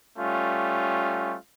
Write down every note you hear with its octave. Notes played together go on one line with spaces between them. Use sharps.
G3 A3 C#4 F4